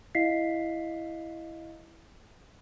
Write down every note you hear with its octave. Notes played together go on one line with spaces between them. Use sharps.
E4 D#5 F5 B6 C7